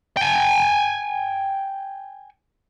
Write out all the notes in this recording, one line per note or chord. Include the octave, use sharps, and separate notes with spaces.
G5 G#5